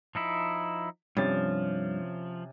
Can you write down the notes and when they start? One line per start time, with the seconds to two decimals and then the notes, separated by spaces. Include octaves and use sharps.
0.15 F3 D#4 E4
1.17 G2 C3 F3 C#4 A6